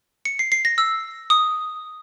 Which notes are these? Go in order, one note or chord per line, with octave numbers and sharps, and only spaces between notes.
C#7
C7
C7
A#6
E6
D#6